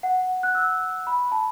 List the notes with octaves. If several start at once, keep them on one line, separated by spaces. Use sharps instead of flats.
F#5
F#6
E6
B5
A5